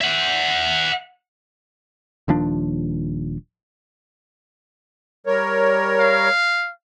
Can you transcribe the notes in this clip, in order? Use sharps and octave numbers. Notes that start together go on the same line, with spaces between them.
E5 F#5
D#1 D#2 F3 D4
G3 A#4 C#5
F5